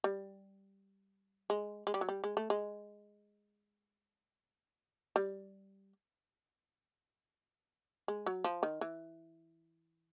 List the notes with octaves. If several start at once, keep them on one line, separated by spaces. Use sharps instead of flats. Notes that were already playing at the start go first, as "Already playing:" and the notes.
G3
G#3
G#3
G3
F#3
G3
G#3
A3
G#3
G3
G#3
F#3
F3
D#3
E3